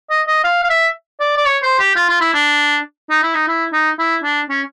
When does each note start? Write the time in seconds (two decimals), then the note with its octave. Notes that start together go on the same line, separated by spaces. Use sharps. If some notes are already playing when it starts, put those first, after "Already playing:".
0.10 D#5
0.28 D#5
0.44 F5
0.64 F5
0.70 E5
1.20 D5
1.37 D5
1.46 C#5
1.63 C5
1.79 G4
1.96 F4
2.09 F4
2.21 E4
2.34 D4
3.10 D#4
3.23 E4
3.35 D#4
3.48 E4
3.73 D#4
3.99 E4
4.23 D4
4.49 C#4